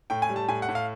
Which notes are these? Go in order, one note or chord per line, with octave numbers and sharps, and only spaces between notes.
A2 G5
G#5
G3
A5
A2 G#5
F#5
A2
F5